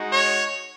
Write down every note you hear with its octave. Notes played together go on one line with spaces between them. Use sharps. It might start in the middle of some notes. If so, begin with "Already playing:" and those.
Already playing: G#3 D#4 F#4
C#5